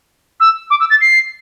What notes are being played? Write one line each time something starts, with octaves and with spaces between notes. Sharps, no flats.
E6
D6
E6
A6
C7